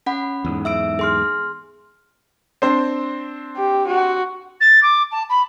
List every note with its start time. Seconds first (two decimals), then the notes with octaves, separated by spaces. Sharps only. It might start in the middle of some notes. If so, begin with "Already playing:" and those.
0.06 C#4 F#5 B5
0.45 E2 G#2
0.65 E5 E6 D7
0.99 G#4 C6 F6
2.62 C4 D4 C5
3.57 G4
3.87 F#4
4.60 A6
4.82 D6
5.11 A5
5.29 B5